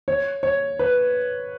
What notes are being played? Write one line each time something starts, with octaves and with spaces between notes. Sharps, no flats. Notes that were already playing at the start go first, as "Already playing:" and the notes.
C#5
C#5
B4